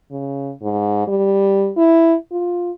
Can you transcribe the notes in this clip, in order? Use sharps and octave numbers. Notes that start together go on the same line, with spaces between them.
C#3
G#2
G3
E4
F4